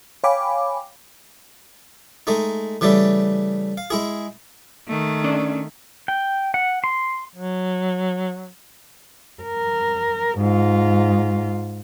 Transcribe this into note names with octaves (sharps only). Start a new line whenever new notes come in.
C#5 F5 G5 G#5 B5 D6
G#3 A3 D#4
C#3 E3 G3 A3 A4
F5
G#3 E4 G#4
D#3 A3
C#4 D4 D5
G5
F#5
C6
F#3
A#4
G#2 F4